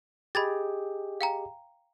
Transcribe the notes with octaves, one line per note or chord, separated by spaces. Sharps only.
G4 G#4 D#5 B5 G#6 A6
F5 G5 A#5